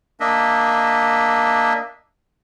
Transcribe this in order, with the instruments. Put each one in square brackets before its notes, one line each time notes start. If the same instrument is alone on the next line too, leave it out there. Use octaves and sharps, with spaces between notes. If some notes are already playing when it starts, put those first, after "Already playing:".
[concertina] A#3 D4 D#5 E5